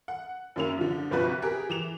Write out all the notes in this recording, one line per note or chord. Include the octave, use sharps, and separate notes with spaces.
F#5
F#2 D#3 A#3 C#4 E4 F7
D3 F3
G1 C2 F3 F#4 B4 F#6
G4 G#4 A#4
E3 E7 F7